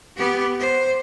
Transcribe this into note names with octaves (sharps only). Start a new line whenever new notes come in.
B3 G4
C5